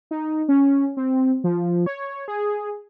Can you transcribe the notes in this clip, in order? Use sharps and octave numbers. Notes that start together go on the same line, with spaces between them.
D#4
C#4
C4
F3
C#5
G#4